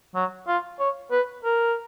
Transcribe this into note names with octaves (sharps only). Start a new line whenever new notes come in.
F#3
F4
C#5
B4
A#4